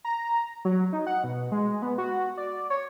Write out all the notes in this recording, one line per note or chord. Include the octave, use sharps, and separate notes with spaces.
A#5
F#3
D#4
F#5
B2
G#3
B3
F#4
D5
C#5